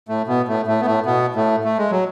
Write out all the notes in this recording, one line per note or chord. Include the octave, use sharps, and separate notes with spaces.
A2 A3
B2 B3
A2 A3
A2 A3
B3
A2 A3
B2 B3
A2 A3
A3
G#3
F#3